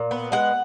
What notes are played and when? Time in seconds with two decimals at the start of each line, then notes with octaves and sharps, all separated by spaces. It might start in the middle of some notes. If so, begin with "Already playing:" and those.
Already playing: A#2
0.11 B3
0.32 G#3 F#5